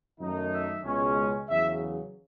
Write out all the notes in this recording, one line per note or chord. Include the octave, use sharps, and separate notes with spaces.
F#2 D#3 A3 D#4
E5
C#2 B2 G#3 C#4
E2 C#3 F#3 E5